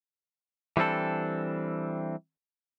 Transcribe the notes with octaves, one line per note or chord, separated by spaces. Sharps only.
E3 G3 C4 D4 A4